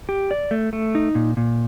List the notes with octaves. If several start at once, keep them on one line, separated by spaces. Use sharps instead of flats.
G4
D5
A3
A3
D#4
A#2
A#2